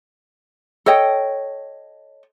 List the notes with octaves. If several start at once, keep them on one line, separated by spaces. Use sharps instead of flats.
A4 C#5 D#5 G5